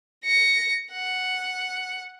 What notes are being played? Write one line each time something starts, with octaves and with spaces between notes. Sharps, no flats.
A#6 C#7
F#5